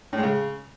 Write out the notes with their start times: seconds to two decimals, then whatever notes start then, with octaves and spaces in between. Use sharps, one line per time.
0.13 A2
0.18 G#3
0.23 C#3